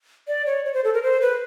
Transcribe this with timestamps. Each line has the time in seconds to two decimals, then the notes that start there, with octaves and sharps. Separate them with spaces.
0.28 D5
0.46 C#5
0.65 C#5
0.74 C5
0.84 A4
0.94 A#4
1.03 C5
1.21 B4